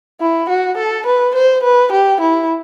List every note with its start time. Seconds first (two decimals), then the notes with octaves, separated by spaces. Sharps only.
0.21 E4
0.49 F#4
0.77 A4
1.06 B4
1.35 C5
1.63 B4
1.92 G4
2.21 E4